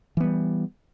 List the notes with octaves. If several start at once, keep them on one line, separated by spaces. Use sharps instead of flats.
E3 G3 B3